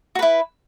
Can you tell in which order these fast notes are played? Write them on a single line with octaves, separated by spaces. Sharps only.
F#4 B4 E4